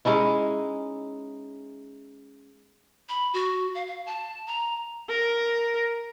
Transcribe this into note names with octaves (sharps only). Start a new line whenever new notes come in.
G#3 C#4 D#4 E4
B5
F#4
F5
F5
A5
A#5
A#4